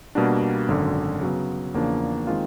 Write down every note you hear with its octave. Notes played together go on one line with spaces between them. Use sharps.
B2 G3 A#3 D4 F#4
G#1 F#2 D3
C#3 F#3 B3
E2 C#3 F3 A#3 D4
D#3 G#3 C4 F4